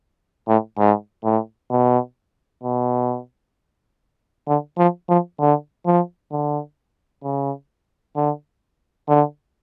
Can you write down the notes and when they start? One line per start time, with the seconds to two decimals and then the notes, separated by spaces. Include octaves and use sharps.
0.48 A2
0.78 G#2
1.24 A2
1.71 B2
2.63 B2
4.47 D3
4.78 F3
5.09 F3
5.39 D3
5.86 F3
6.31 D3
7.24 C#3
8.16 D3
9.08 D3